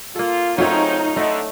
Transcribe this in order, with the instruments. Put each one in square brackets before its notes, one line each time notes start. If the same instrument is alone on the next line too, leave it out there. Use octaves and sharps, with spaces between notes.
[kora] A#3 A4 [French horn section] F4
[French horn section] C#3 C4 [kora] F#3 A3 C#4 [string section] D#4 [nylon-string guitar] F4 C#5
[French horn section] D3 [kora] A3 D#4 [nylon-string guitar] D#5